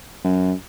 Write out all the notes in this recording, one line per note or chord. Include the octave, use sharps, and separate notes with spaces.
F#2